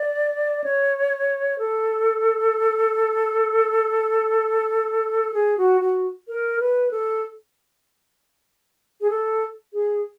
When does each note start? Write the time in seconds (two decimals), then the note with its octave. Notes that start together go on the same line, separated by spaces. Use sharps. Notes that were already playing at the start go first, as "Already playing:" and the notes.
Already playing: D5
0.64 C#5
1.58 A4
5.34 G#4
5.58 F#4
5.81 F#4
6.28 A#4
6.60 B4
6.91 A4
9.01 G#4
9.10 A4
9.73 G#4